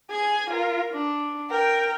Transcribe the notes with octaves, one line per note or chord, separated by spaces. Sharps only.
G#4 G#5
F4 A#4
D4
A#4 G5